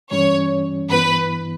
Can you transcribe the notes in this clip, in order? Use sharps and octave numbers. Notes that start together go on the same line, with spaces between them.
G2 E3 G3 C#4 C#5
G2 E3 B3 E4 B4